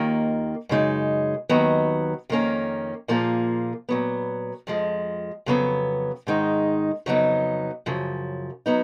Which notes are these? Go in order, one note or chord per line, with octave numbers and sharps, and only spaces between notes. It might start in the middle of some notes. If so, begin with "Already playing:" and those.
Already playing: D#2 D#3 A#3 F4
F#2 C#3 G#3 D#4
D#2 D#3 F#3 B3
F2 D#3 A#3 C#4
A#2 F3 A#3 F4 G#4
A#2 F#3 B3
F2 F3 G#3
F2 C#3 F#3 B3
G#2 D#3 G#3 D#4
F2 C#3 F#3 B3 D#4
F#2 C#3 F3
F#3 B3 D#4